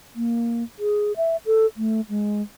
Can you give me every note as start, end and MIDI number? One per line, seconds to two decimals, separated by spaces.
0.16 0.63 58
0.79 1.16 68
1.17 1.37 76
1.46 1.66 69
1.77 2.01 57
2.09 2.42 56